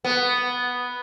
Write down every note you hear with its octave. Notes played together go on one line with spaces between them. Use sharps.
B3